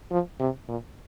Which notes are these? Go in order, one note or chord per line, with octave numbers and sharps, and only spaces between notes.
F3
C3
A#2